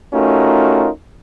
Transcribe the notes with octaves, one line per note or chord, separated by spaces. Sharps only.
A3 C#4 D#4 F4 F#4 A#4